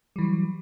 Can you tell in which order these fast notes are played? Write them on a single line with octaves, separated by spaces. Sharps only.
G3 E3 F#3